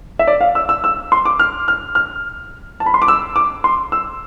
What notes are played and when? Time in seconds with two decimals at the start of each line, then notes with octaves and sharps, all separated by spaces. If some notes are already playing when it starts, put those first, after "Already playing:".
0.19 E5
0.27 D5
0.41 F5
0.55 E6
0.69 E6
0.84 E6
1.12 C6
1.25 D6
1.39 F6
1.68 F6
1.95 F6
2.80 A5
2.86 B5
2.94 C6
3.02 D6
3.08 E6
3.36 D6
3.64 C6
3.92 E6